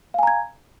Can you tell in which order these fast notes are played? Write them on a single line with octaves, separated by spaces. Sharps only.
F5 G#5 A#5 G#6